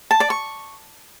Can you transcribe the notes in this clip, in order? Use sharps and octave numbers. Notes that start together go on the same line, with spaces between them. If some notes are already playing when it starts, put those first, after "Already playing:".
A5
D5
C#6